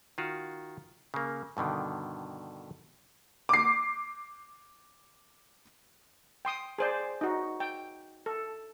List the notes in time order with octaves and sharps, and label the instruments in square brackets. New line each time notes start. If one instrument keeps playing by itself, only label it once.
[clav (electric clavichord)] D#3 F4 F#4
C#3 A#3
G2 B2 D3 D#3
[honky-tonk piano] D6 C7
[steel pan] G5 C6 D#6
G#4 C5 D5
D#4 F#4
G5
A4